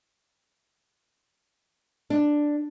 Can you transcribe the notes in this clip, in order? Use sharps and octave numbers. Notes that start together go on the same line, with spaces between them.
D4